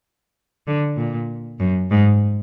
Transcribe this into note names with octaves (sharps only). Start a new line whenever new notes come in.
D3
A#2
F#2
G#2